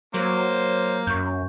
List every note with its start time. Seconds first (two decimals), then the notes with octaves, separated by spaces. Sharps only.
0.14 F#3 A#3 C5
1.07 F#2 C#6 G6